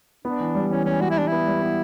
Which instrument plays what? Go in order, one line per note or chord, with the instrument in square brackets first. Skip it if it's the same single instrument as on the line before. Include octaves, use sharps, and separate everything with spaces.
[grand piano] B3 [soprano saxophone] D4
[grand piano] E3
G3
[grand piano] E3 [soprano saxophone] C#4
[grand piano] E3 [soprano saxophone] C#4
[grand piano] G3 [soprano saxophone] F#4
[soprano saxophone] E4
[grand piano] G3 [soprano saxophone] D4
[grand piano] B3 [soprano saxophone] E4
[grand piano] G3
B3